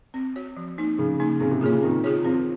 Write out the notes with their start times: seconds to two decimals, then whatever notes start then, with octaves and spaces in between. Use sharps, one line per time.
0.14 C4
0.36 F#4 C#5
0.57 F3
0.78 A#3 D#4
0.98 C#3 F3
1.20 A#3 D#4
1.40 C#3 C4
1.51 C3
1.61 A#2 F4 G#4 C#5
1.72 C#3
1.82 D#3 C4
2.04 F4 G#4 C#5
2.24 F3 C4